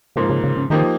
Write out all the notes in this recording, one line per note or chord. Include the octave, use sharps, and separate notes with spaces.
G#2 C#3 F3 A#3
C#3
C#3
C#3
D#3 F3 A#3 D#4 G4